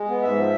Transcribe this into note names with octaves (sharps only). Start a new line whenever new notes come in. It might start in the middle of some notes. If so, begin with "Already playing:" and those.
Already playing: G#3
B3
G#2 E5
F3